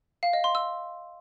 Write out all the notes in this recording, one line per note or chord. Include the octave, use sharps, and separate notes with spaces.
F5
D#5
C6
E6